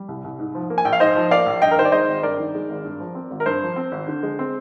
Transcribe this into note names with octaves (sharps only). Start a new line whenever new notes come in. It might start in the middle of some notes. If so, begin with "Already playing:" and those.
Already playing: G3
C2
C2
G#2
F3
A#3
G#5
A#1 G5
F5
G#2 C5 D#5
F3
A#3 D5 F5
A#1
G2 D#5 G5
A#4
D#3 C5
D5
G#3 C5 D#5
G#1
G2 A#4 D5
D#3
G#3
G#1
G2
F3
C4
G#1
A#4
G2 C5
F3
C4
G#1
D3
G#3
C4